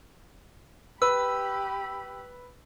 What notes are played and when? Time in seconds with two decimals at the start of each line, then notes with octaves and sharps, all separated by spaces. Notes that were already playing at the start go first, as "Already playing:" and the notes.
1.02 G4 B4 B5 E6